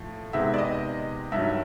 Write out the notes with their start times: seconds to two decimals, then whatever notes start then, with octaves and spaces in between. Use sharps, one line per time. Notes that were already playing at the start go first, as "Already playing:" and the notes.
Already playing: A2 F3
0.33 C3 D#3 G#3 B3 E5
0.54 D5
0.58 D#5
1.32 G2 D#3 F#3 E5